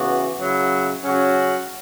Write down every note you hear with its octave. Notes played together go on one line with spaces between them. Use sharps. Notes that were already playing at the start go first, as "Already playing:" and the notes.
Already playing: C#3 E3 B3 F#4
C#3 F#3 E4
C#3 F#3 C#4 F#4